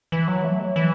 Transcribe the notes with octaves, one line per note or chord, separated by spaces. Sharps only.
E3
F#3
A3
F#3
E3